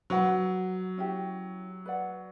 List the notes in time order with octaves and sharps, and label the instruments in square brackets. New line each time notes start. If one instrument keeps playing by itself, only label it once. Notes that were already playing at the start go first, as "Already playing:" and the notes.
[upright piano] F#3 [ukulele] B4 F#5 B5
[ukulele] C#4 E4 G4
B4 D5 F#5